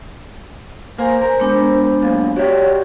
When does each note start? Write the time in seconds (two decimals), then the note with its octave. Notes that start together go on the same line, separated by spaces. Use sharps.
0.98 A#3 C5 G#5 A#5 C6
1.21 A#4
1.40 G#3 B3 D4
2.03 F#2 A#2
2.36 F#4 G4 C#5 D5 E5